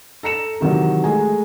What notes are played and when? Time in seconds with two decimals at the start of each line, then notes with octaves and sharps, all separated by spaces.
0.23 A4 A#5 C#7 E7
0.61 C3 D#3 E3 F#3
1.04 G#3 A3 G#4 G#5 A#5